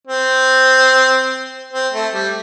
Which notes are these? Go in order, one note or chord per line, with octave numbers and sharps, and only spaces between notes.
C4
C4
A3
G3